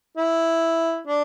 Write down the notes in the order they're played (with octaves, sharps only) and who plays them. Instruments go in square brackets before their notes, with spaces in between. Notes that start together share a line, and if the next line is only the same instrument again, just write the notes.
[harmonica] E4
D4